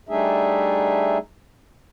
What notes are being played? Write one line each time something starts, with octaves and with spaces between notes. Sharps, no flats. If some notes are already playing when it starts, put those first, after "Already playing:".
G3 A3 D4 D#4 G#4 E5